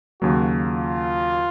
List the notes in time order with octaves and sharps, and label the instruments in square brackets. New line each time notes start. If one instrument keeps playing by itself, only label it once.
[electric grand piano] D#2 C#3 F#3 A#3 [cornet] F#4
[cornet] F4